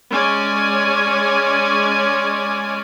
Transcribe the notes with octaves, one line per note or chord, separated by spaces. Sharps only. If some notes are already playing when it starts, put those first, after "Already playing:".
G#3 C#4 C#5 D5 G#5